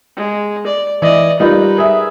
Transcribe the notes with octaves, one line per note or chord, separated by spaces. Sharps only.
G#3
D5
E3 D5 D#5
G3 D#4 F4 A#4 B4
G#4 E5